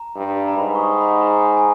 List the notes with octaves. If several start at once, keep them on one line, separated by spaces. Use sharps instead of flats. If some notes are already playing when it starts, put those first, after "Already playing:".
Already playing: A#5
G2
A#5
G#2 B5
C#6
D#6
B5
A#5
G#5
G#5